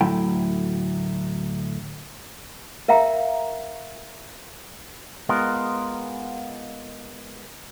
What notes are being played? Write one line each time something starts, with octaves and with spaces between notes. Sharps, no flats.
D2 A2 F#3 E4 G5
A#4 E5 F5 G5 A#5
G#3 B3 F4 A#4